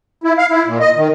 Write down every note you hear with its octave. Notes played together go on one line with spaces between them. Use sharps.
E4
F5
E4
A#2
D#5
D#3